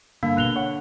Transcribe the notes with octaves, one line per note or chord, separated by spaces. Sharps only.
G2 D3 A#3 F5
G#1 B2 F#6 F7 G7
C#5 F#5